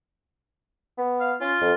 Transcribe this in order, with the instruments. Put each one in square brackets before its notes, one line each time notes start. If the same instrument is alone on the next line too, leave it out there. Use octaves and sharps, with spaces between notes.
[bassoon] B3
[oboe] F5
[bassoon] C#4 [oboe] F4
[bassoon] F2